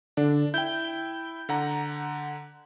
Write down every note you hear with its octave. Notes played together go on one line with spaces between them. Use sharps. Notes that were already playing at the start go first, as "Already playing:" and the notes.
D3 D4
E4 G5 G6
D3 F#5 A#5